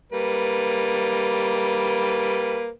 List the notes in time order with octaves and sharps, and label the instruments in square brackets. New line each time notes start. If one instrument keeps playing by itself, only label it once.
[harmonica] G3 A#3 B4